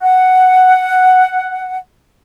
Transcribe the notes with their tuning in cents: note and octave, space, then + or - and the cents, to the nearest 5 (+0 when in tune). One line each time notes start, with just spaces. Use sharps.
F#5 +0